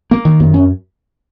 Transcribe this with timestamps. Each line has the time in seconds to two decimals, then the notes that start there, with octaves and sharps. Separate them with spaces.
0.11 A#3
0.25 D#3
0.40 F#2
0.54 C#4